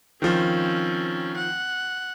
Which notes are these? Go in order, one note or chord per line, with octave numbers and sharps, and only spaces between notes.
D#3 F3 C4 C#4
F#5